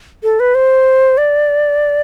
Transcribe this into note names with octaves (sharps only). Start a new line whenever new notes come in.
A4
B4
C5
D5